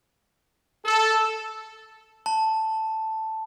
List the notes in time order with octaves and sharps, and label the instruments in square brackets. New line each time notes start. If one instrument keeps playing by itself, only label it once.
[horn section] A4
[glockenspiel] A5